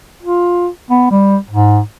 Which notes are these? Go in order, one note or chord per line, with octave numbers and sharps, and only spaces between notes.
F4
B3
G3
G#2